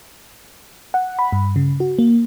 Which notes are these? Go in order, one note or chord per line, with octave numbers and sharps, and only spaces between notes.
F#5
B5
G2
C#3
F#4
A#3